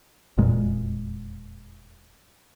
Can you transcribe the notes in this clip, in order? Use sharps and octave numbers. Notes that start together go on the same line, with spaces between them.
E1 F2 A#2 G#3